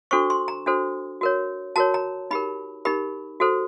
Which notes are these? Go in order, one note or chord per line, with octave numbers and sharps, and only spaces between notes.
D4 F#4 A4 C5 C#6
C6
A#5
D4 F#4 A4 C5
F#4 A#4 C#5
F#4 A#4 C#5 A5
A#5
D#4 G4 A#4 B5
D#4 G4 A#4 B5
F#4 A4 C5